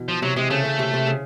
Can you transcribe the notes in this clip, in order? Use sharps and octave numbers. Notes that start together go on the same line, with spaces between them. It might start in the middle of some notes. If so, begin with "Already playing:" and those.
Already playing: B2 E3
F3
C3 F#3
C3 G#3
C#3 A3
C#3
C3
C3
C#3